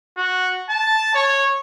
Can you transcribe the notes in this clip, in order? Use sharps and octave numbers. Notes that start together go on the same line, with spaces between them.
F#4
A5
C#5